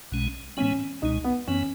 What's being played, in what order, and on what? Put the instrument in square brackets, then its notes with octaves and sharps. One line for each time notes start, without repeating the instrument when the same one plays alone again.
[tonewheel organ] B1 B2 G#3 C#4
[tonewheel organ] A2 E3 G#3 B3 [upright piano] C#4
[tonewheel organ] C#2 B2 G#3 [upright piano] D#4
[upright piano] B3
[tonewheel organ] F#2 E3 B3 [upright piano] C#4